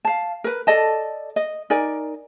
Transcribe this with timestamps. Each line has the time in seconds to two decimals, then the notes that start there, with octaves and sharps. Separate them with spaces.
0.05 F5 A5
0.44 A#4 B4
0.67 A4 D5 D#5 A5
1.36 D#5
1.70 D#4 A#4 D5 G#5